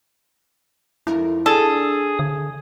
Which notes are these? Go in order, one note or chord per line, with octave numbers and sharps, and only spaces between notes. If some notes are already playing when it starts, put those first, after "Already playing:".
F2 D#4 E4 A#4
D4 G#4 A4 D#6
D3